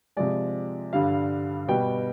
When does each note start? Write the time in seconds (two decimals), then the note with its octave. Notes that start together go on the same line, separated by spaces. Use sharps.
0.17 C3 F3 G#3 D5
0.93 G2 D3 G3 F5
1.68 B2 G3 B3 G5